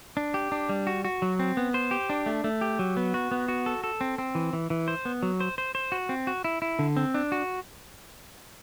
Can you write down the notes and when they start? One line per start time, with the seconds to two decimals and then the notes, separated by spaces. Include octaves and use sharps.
0.17 D4
0.34 G4
0.52 D4
0.69 G3
0.87 F#4
1.05 F#4
1.22 F#3
1.39 C4
1.57 B3
1.74 C5
1.91 G4
2.10 D4
2.26 A3
2.44 A3
2.61 G4
2.79 F#3
2.97 B3
3.14 F#4
3.31 B3
3.48 F#4
3.66 A4
3.84 A4
4.01 C4
4.18 C4
4.35 E3
4.53 E3
4.70 E3
4.88 C5
5.05 B3
5.23 F#3
5.40 C5
5.58 C5
5.75 C5
5.92 F#4
6.09 C4
6.27 F#4
6.44 E4
6.62 E4
6.79 D3
6.97 C4
7.14 D4
7.32 F#4